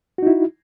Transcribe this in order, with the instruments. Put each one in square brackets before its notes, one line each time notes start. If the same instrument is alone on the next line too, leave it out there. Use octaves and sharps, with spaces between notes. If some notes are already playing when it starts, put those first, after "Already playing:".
[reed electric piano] F#4
D#4
E4